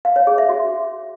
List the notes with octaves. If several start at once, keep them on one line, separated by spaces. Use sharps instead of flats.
F5
C#5
G#4
E5
F#4